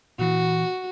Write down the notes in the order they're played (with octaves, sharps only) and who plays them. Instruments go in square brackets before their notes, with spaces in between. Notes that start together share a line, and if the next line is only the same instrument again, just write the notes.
[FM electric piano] A#2 E3 [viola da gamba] F#4